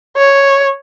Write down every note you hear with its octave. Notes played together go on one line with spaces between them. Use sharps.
C#5